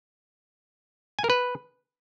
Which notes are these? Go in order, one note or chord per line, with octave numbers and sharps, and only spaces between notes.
G#5
A#4
B4